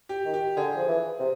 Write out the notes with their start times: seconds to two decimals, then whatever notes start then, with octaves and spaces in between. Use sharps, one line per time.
0.09 G4
0.25 D#3
0.34 G4
0.57 D3 G#4
0.76 F3
0.88 E3
1.19 C3